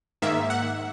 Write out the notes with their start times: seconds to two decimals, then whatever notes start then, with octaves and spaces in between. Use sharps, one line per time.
0.22 G#2 D#3 A#3 E5
0.50 F#5